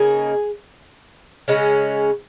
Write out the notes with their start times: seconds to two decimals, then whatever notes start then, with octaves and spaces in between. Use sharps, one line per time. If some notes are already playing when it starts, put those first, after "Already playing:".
Already playing: C#3 A#3 D#4 G#4
1.48 C#3 G#3 C#4